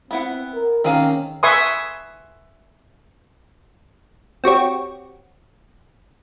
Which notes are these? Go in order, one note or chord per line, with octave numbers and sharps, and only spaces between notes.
B3 C4 E4 F#5
A#4
D#3 A#3 C4 C#4 G#4 F5
B4 E5 G#5 C6 C#6 D#6
C4 F#4 G4 C#5